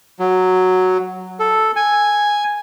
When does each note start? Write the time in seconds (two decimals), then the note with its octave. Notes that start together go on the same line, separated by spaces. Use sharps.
0.20 F#3
1.40 A4
1.76 G#5